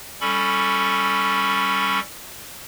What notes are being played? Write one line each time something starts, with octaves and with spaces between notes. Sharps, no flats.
G3 C#4 A4 B5 C#6